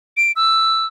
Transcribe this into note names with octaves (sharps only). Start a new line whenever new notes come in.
D7
E6